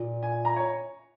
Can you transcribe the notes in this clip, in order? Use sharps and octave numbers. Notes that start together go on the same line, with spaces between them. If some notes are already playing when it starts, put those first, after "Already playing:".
Already playing: A#2
G#5
A#5
C#5